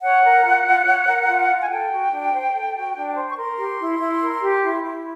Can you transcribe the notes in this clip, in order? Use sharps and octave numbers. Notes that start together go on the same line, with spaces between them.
C#5 F#5
A#4
F4
F4
C#5
A#4
F4
F4
G#5
A4 G5
F#4
D4
C5
A4
F#4
D4
C5
C#6
A#4 C6
G4
E4
E4
A#4
G4
E4
E4